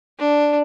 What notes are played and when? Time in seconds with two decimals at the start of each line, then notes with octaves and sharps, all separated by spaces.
0.19 D4